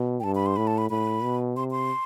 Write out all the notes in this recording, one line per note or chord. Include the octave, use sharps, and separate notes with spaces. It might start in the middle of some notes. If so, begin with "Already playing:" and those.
Already playing: B2
G5
G2 A5
B5
C6
A2 B5
A5
B5
A2 B5
B2
C3 C6
C6